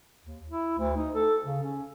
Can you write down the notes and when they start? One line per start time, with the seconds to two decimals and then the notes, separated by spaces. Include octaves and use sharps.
0.24 D#2
0.50 E4
0.78 D2
0.96 D#4
1.15 A4
1.45 C#3
1.62 C#4